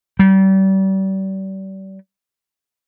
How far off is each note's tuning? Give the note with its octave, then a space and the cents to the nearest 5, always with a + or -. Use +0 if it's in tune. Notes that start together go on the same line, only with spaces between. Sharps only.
G3 -35